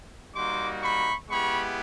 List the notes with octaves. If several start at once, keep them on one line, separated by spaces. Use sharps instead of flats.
G3 A#3 D#4 F#4 C6 D6
B5 C#6
G#3 B3 E4 G4 B5 C#6